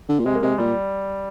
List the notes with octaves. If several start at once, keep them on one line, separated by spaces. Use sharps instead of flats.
D3
A#2
C3 G#3
A#3
C3 G#3
A#2 G3